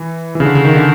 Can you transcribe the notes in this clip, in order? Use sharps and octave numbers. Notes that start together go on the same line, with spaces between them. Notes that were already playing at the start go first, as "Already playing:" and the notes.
Already playing: E3
E3
C#3
D3
C#3
D#3
D3